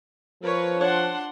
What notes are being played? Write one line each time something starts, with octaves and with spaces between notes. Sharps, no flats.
F3 A#4 B4 C#5
D4 C#5 F#5 C6